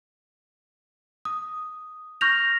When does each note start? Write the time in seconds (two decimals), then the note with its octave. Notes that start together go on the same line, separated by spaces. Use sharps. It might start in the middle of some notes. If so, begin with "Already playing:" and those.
1.25 D#6
2.21 C#6 F6 G6 A#6 F7